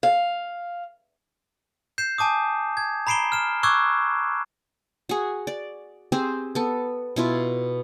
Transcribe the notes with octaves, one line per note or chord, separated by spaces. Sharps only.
F5
G6 C7 E7
G#5 A5 D6 D#6
G#6
A#5 B5 C7 D7 E7 G7
F6 E7
C#6 D6 E6 F#6 G#6
F#4 G#4
D5
C4 G4 G#4 C5
B3 A4
B2 E4 F4